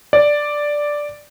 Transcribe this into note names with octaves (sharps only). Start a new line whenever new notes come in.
D5